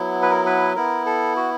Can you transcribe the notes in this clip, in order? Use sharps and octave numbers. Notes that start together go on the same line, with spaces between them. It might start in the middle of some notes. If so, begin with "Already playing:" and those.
Already playing: F#3 B3 E4
B4
A#4
B4
B3 E4 A#4
A4
F#4